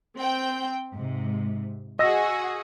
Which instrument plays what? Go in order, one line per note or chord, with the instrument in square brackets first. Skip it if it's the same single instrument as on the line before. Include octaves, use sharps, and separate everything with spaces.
[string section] C4 G5
G#2 C3
[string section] F#4 G#4 [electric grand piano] D#5 E6 A#6